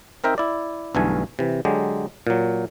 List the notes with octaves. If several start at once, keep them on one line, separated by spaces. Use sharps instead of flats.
C4 D#4 A#4 D#5 E5 G5
E4 D5
B1 G2 D3 E3 A3 G#5
C3 E3
D3 F#3 G#3 G4
A#2 F#3